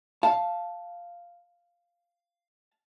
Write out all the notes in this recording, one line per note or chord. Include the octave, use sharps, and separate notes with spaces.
F5 A5